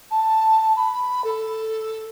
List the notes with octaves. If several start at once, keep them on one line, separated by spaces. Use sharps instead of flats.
A5
B5
A4